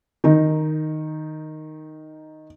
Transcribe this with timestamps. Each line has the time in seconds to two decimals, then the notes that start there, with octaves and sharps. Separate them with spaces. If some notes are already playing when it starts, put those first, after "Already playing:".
0.24 D#3 D#4